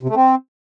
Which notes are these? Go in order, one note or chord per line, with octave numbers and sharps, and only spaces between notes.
C3
A3
C4